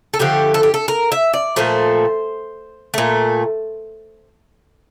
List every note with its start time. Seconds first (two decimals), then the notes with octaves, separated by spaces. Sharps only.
0.14 A4
0.19 D3 F3 A3 G4
0.54 A4
0.63 G4
0.74 A4
0.88 A#4
1.12 E5
1.34 D5
1.56 A#2 F3 A3 C5
2.94 A#2 A3